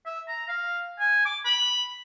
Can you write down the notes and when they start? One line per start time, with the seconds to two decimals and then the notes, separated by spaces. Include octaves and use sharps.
0.06 E5
0.28 A#5
0.48 F5
0.99 G#5
1.26 D6
1.45 B5